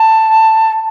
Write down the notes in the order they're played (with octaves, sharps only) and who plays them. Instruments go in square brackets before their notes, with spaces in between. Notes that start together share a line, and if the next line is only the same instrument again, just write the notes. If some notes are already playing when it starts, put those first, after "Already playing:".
Already playing: [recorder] A5